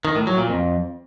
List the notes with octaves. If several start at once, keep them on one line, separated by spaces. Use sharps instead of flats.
D#3
A2
F#3
A#2
F2